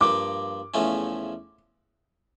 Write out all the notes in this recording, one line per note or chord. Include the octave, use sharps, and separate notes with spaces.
G2 F3 A#3 D6
E2 C#3 F3 A3 C#4